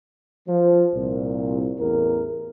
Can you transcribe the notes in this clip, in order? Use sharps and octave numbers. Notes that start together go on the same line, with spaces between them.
F3
C2 A#2
A1 E2 A#4